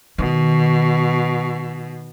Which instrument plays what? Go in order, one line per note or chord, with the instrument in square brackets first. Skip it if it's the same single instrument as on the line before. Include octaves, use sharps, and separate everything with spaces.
[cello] B2 [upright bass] D#3